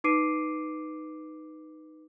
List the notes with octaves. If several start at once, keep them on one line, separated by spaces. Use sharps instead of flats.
D#4 B4 D6 C7 D7 D#7